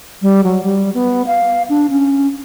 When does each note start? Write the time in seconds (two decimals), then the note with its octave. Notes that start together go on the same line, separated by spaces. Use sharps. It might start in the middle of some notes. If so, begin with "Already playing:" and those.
0.22 G3
0.44 F#3
0.64 G3
0.94 B3
1.26 F5
1.69 D4
1.90 C#4